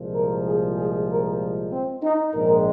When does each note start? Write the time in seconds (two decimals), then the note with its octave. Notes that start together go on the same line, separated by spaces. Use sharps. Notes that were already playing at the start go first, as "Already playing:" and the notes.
Already playing: C2 A#2 F3 G#3
0.14 A#4
0.44 G#4
0.77 G#4
1.09 A#4
1.71 C4
2.03 D#4
2.34 A#1 G#2 D#3 G#3 A#4